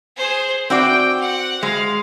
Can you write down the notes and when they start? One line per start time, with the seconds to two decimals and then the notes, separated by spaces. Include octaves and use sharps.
0.17 G#4 C5
0.70 C4 F#4 D5 G5
1.20 F#5
1.63 G#3 F5